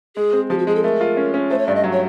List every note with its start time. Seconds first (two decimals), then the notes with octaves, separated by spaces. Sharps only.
0.16 G#3 G#4
0.33 C4
0.50 F3 G4
0.59 F#4
0.67 G#3 G#4
0.75 A4
0.83 A3 A#4
1.01 F4
1.17 C#4
1.34 C#4
1.50 A3 C5
1.58 C#5
1.67 G2 D5
1.75 D#5
1.84 F#3
1.93 C#5